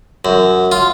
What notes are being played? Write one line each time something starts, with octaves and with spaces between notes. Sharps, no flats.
F#2
F4